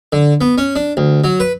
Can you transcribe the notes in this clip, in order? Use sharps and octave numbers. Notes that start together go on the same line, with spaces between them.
D3
B3
C#4
D4
D2
F#3
B4